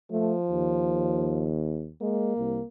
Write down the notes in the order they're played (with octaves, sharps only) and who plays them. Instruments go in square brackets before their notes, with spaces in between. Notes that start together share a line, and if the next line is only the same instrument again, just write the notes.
[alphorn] F3 [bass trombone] A3
[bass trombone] D#2
[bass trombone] G#3 [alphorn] A#3
[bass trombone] C2